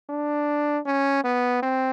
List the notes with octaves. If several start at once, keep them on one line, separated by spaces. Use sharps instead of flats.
D4
C#4
B3
C4